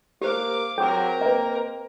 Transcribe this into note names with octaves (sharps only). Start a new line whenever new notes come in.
A#3 G4 C5 F5 D6
F#3 C4 G#4 A#4 G5 D6
A#3 B4 D#5